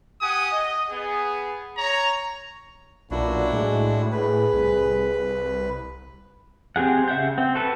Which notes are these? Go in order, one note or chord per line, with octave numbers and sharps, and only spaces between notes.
G4 F#5 G#5 D#6
D#5
B3 G#4
C#5 A#5
B1 A#2 D4 E4 F#4
A2 G#3
G#4 B4
C2
C4 G4 G#4 F#5
C#3 E5 F#5 G6
C4
F#4 A4 B4